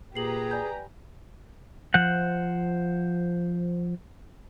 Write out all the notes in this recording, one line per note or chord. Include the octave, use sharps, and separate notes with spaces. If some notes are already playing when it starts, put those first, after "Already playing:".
A#2 G4 G#4 B4 A#5 C7 F#7
D5 G#5 G6
F3 C5 F#5